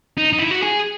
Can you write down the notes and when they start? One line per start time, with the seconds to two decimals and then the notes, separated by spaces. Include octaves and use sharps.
0.18 D#4
0.33 D#4
0.39 E4
0.51 F#4
0.62 G#4